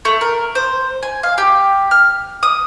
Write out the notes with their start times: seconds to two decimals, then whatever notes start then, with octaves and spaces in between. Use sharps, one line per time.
0.05 A3
0.21 A#4
0.55 C5
1.03 G#5
1.23 F5
1.38 G4
1.91 F6
2.43 D#6